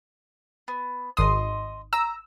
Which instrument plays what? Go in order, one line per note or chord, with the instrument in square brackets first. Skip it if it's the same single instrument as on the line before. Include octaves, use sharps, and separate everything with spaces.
[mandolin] B3
[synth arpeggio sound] G#1 D#6 [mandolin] D#5 C6
[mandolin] A#5 [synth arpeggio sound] E6